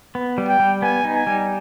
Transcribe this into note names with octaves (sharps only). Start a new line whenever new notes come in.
B3
G3
G5
G3
B3 G#5
D#4
G#5
G3